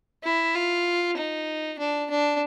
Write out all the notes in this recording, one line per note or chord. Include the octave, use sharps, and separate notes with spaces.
E4
F4
D#4
D4
D4